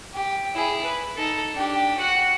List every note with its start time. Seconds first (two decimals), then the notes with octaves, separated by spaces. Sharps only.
0.14 G4
0.54 E4 G#4
0.84 B4
1.16 D#4 A4
1.53 D4 G4
1.97 F#4 F#5